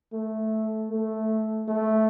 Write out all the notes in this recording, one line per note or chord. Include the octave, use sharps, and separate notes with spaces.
A3
A3
A3